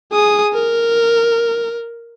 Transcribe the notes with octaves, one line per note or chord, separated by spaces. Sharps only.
G#4 D#6
A#4